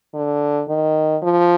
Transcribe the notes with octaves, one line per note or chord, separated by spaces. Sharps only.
D3
D#3
F3